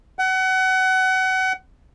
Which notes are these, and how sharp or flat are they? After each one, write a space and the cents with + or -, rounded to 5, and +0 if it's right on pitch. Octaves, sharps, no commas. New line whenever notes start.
F#5 +30